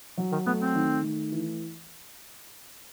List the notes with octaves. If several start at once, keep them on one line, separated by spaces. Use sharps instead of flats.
F#3
D#3
A3 B3
C4
D#3
A3
E3